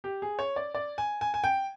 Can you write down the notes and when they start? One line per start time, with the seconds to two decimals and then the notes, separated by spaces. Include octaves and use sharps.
0.04 G4
0.22 G#4
0.39 C#5
0.56 D5
0.74 D5
0.98 G#5
1.21 G#5
1.34 G#5
1.44 G5